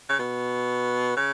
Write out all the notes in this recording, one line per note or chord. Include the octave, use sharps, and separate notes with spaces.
C#3
B2
C#3